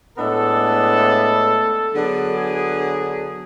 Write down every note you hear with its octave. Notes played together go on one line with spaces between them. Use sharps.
A2 G#3 B3 D4 A4
D3 F#3 B3 D4 G#4
G#4